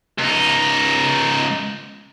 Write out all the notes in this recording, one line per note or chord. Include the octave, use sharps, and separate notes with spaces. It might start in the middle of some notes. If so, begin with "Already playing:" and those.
C#2 D#4